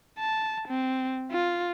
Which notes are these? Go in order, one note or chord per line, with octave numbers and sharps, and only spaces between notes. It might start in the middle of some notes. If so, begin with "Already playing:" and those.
A5
C4
F4